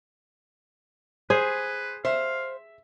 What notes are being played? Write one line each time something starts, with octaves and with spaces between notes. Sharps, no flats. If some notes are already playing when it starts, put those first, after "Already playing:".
G#4 B4 C5
C5 E5 F5